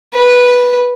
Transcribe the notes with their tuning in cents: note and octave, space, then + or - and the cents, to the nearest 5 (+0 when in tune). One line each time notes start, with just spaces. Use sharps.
B4 -10